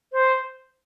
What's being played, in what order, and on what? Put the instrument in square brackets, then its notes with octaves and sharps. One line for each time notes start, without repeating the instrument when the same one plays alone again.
[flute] C5